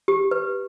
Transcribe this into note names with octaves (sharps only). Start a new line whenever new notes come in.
G4
B4